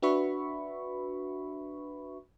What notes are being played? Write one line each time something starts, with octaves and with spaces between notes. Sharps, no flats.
D4 F#4 B4 E5 B5 C#6